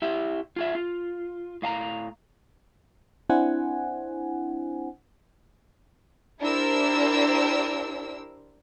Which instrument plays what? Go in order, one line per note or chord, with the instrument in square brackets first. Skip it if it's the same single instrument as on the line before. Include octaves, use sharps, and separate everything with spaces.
[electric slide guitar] E4 G4 E5
F4 G#4 E5
F4
A2 F5 A5 A#5
[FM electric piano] C4 D4 E4 C5 F#5 G#5
[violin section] D4 E4 G4 A#4 C5 E6